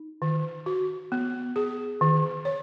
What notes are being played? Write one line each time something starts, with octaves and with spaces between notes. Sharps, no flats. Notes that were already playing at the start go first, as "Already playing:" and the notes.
Already playing: D#4
D#3
F#4
B3
G#4
D#3
C#5